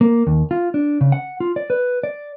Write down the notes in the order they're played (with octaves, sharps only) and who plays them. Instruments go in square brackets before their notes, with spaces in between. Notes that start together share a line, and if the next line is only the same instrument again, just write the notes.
[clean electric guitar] A#3
D#2
F4
D4
C#3
F#5
F4
D5
B4
D5